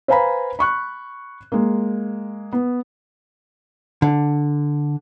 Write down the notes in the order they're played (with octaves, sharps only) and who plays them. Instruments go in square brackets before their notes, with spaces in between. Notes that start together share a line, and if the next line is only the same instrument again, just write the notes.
[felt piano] B4 C5 F5 G#5 A#5 B5
B5 C#6 F#6
G#3 A#3
B3
[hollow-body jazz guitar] D3